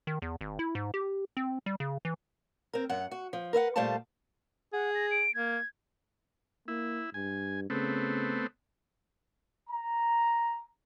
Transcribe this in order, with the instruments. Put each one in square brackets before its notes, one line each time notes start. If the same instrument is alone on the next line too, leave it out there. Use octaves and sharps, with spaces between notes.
[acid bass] D#3
E2
G#1
E4
G#2
G4
C4
G3
C#3
E3
[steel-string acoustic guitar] C4 A#4
F#2 F#5
F#4
F3
A#4 B4 E5 F#5
A#2 G3 A3 C5 F5 A5
[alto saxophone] G#4 [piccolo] F#5
[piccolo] A#6
D7
[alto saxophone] A#3 [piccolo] G#6
[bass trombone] A#3 [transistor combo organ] E4
[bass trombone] G2 [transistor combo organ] G#5
[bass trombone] C#3 [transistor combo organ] A3 B3 C4
[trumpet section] A#5